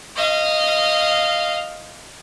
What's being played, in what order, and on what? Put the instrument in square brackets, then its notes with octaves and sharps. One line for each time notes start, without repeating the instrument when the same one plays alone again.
[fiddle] D#5 F5